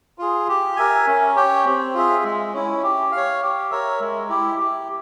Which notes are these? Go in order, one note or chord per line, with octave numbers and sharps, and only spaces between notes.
F4 G#4
G4
A#4 E5 G#5
C#4
G4 C#5 G5
C4
F4 G#4 E5
G#3
C#4 E4
G4
C#5 F5
G4
A#4 C#5 E5
G#3
E4 G4
G4